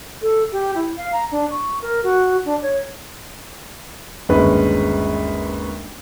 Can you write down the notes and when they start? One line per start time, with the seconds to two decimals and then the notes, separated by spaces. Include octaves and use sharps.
0.22 A4
0.52 G4
0.75 E4
0.96 F5
1.12 A#5
1.31 D4
1.51 C#6
1.81 A#4
2.03 F#4
2.45 D4
2.62 C#5
4.29 G1 D#2 G#3 C#4 B4